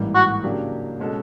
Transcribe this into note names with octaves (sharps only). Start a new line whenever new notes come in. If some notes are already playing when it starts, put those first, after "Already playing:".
Already playing: A1 G#2 E3 G3 A#3
F#4
C#3 F#3 A#3 D4 G4
B2 G#3 C#4 F#4 A4